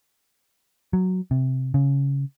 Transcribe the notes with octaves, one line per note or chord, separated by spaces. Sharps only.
F#3
C3
C#3